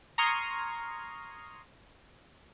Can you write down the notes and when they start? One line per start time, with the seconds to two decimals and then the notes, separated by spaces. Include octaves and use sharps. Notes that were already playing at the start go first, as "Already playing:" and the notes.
0.18 A#5 C6 C#6 D#6 F6 G#6